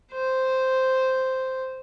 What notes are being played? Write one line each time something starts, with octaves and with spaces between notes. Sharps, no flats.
C5